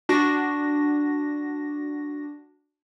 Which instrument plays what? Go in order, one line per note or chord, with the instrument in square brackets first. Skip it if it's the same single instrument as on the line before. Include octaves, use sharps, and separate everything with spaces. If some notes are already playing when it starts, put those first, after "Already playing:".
[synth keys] D4 F#4 A#6